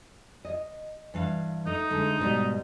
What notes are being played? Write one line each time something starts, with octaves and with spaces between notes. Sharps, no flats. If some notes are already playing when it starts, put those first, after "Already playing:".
D#5
G2 E3 F5
A3 D#4
D3 G#3 A3
G#2 B2 G3